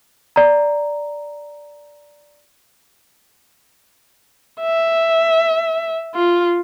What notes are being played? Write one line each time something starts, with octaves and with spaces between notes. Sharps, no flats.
D5 A#5
E5
F4